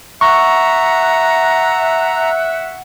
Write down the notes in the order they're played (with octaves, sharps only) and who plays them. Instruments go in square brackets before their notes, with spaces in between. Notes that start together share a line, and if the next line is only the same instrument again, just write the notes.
[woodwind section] E5 F#5 [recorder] A#5 [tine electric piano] C#6